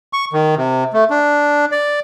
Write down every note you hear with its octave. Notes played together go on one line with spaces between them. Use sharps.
C#6
D#3
C3
A3
D4
D5